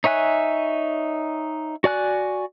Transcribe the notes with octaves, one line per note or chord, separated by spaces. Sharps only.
D#4 C#5 E5 G#5 F#6
F#4 D5 G#5 F#6